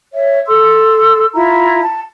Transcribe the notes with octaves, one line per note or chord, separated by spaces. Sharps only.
C#5 E5
A4 C6 E6
E4 F4 A#5
A5